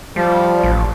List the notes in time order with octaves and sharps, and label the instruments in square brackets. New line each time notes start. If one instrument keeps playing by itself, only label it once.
[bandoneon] F3 [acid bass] G3
[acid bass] A1